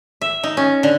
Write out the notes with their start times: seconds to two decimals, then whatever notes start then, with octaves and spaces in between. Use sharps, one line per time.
0.21 E5
0.43 D#4
0.57 C#4
0.83 D3